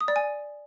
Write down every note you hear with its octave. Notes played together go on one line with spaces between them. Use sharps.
D#6
D5
G#5